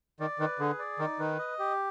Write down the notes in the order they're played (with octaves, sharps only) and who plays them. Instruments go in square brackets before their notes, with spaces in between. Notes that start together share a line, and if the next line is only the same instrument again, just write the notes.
[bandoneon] D#3 [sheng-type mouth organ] D5
[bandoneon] D#3 [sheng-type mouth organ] B4
[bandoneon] D3 [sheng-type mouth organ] G#4
[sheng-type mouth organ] D5
[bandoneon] D#3 [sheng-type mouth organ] D#4
[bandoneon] D#3 [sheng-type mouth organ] B4
[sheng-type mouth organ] D#5
G4